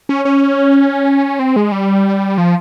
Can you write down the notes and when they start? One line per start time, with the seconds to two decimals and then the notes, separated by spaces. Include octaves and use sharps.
0.09 C#4
0.25 C#4
1.39 C4
1.56 G#3
1.72 G3
2.38 F3